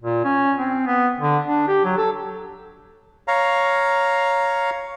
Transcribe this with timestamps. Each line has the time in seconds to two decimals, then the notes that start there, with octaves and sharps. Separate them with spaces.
0.02 A#2
0.24 C#4
0.58 C4
0.86 B3
1.20 D3
1.46 D4
1.68 G4
1.85 F#3
1.97 A4
3.28 C#5 F5 A#5